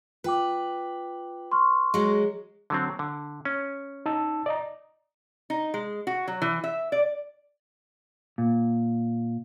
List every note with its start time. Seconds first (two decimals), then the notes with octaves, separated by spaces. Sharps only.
0.24 F4 B4 G5 D6
1.51 C6 C#6 F6
1.94 F#3 G#3
2.70 D3 F#3 C4
2.99 D3
3.45 C#4
4.06 D#4 A5 E6
4.46 D5 D#5 A#5
5.50 D#4
5.74 G#3
6.07 F#4
6.28 F#3
6.42 E3
6.64 E5
6.92 D5
8.38 A#2